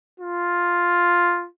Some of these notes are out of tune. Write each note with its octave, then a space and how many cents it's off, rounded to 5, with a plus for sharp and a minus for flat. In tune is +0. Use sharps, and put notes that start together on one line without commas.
F4 +5